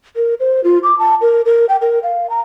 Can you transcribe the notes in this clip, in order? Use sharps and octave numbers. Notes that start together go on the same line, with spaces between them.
A#4
C5
F4
D6
A5
A#4
A#4
G5
A#4
F5
A#5